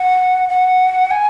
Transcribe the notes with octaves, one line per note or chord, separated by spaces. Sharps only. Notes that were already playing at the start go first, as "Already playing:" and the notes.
Already playing: F#5
F#5
G#5